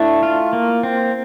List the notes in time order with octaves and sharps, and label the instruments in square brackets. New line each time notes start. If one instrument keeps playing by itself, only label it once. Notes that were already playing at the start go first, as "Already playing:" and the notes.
Already playing: [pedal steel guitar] A3 D4 [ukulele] E4
[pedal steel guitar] F4
A#3
C4